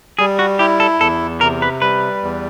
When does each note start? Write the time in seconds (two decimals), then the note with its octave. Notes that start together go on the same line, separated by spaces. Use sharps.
0.19 G3 G#4
0.39 F#4
0.59 E4 G4
0.80 A4
1.00 E2 A4
1.41 C3 A#4
1.62 B4
1.82 G3 B4
2.23 E2